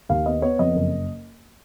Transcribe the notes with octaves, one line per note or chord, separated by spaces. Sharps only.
D#2 F5
B3 D#5
B3 C#5
F2 D#5
F#1